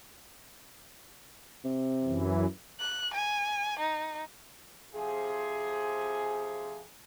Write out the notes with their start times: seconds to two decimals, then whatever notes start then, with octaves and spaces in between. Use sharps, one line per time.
1.64 C3
2.04 F#2 E3
2.80 F#6
3.14 G#5
3.79 D#4
4.95 F2 C3 F3 G#4